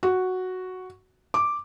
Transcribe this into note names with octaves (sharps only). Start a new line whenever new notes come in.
F#4
D6